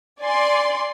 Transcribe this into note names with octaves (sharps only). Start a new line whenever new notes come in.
D5 G#5 C6